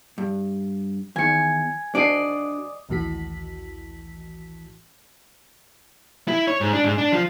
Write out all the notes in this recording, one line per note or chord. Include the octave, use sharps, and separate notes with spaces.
G2
E2 D#3 G#5 C#7
D4 F#4 D5 D#5 C7
A#1 D#2 A2 E3 F#4 B6
E4
C#5
G#2
D4
G#2
D4
F3